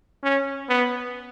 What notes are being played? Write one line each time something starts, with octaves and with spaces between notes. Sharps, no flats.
C#4
B3